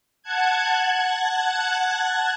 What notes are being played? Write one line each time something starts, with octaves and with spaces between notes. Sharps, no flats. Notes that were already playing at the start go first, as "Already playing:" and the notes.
F#5 A5 F#6 G#6